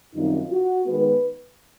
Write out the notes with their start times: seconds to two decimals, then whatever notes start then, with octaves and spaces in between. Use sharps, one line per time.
0.15 F#2 D#3 G3 C4 D#4 F4
0.51 F#4
0.85 D#3 G#3 B3 B4